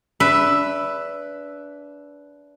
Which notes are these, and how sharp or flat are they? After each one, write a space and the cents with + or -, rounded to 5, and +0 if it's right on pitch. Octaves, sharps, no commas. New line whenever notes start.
D4 -25 B4 +0 E5 +0